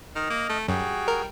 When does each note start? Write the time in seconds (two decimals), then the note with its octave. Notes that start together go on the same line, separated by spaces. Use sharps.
0.15 D#3 D#5 F6
0.30 A#3
0.49 A3
0.68 F#2 G3 F#4 G#4
1.08 A#4